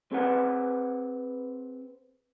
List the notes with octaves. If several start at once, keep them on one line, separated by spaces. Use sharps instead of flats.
C4 G#4 B4 F#5